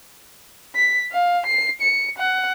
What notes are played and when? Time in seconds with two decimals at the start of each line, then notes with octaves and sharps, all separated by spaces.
0.75 B6
1.12 F5
1.46 C7
1.81 C#7
2.18 F#5